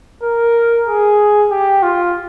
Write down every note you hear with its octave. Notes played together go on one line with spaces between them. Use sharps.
A#4
G#4
G4
F4